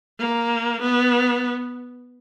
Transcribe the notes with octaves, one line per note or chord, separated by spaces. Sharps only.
A#3
B3